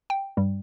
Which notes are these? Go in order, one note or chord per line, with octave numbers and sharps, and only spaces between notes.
G5
G2 G3